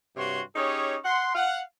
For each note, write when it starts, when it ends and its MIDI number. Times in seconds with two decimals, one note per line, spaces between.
0.17 0.41 43
0.17 0.41 48
0.17 0.41 66
0.17 0.41 73
0.17 0.41 84
0.56 0.96 61
0.56 0.96 63
0.56 0.96 67
0.56 0.96 68
0.56 0.96 73
1.05 1.33 78
1.05 1.33 84
1.35 1.61 77
1.35 1.61 78